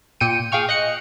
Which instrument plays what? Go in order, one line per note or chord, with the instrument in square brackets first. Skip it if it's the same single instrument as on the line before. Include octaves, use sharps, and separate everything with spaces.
[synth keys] A#2 G5 C#7 D#7
G#4 F5 G5 C#6 F6
D#5 F#6 C#7